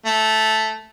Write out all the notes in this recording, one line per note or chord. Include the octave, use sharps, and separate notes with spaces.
A3